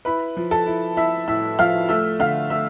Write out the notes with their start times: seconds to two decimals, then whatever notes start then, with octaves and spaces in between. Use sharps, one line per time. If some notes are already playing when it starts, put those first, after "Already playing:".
0.05 E4 B4 B5
0.37 F3
0.51 A4 A5
0.66 E4
0.97 E4 E5 E6
1.28 A2 E5 E6
1.59 F3 F5 F6
1.89 A3 E5 E6
2.19 D3 F5 F6
2.50 A3 E5 E6